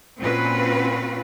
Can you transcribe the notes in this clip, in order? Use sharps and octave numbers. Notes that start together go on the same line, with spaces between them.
A#2 C4 C#4 F4 F#4 B4